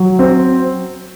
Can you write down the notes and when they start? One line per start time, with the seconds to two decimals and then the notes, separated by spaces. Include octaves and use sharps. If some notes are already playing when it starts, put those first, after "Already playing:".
Already playing: F#3
0.19 C4